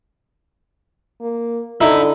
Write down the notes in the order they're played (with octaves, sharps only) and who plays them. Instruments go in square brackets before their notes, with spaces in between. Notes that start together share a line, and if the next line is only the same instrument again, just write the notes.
[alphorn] A#3
[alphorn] D3 [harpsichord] D#4 E4